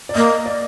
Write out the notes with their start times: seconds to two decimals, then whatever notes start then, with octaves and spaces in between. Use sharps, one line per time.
0.09 D5
0.15 A#3 D#5
0.46 D5